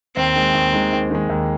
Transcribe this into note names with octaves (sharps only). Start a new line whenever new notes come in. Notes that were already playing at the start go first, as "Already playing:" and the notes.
D#2 C4
D#3 G#3
D#2
D#3 G#3
D#2
D#3 G#3
D#2